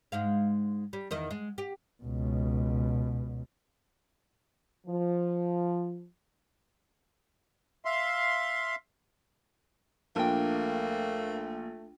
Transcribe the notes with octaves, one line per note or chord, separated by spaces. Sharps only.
G#2 G#3 F5
G3
E2 D#3 D#5
G#3
G4
C#2 B2
F3
E5 F5 C6
A#1 A3 A#3 D4 G5